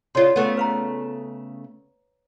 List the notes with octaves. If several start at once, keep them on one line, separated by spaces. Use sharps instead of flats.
C#3 F4 C#5 D5 C6
C#3 A3 B3
B4 F5 A#5